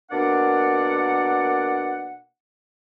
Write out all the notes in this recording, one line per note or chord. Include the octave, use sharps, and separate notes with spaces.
B2 A#3 D4 A#4 D5 F#5